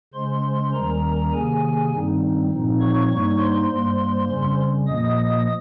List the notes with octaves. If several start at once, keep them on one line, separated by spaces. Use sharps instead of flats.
C#3 G#3 C#4 C5 C6
D#2 D#3 G3 C#4 A#4 A#5
C3 D#3 A#3 G#4 G#5
G2 D#3 G3 C4 D#4
A#2 F3 C4 D#4
C#5 C#6
G2 G3 A#3 D#4
C5 C6
G2 G3 A#3
F2 C#3 G3 C#4 C5 C6
A#2 F3 A#3 D#5 D#6